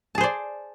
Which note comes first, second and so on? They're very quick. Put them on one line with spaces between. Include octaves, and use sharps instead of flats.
A5 G#4 C5 D5